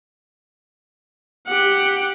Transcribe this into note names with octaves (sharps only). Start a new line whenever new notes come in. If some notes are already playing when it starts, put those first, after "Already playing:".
G4 F#5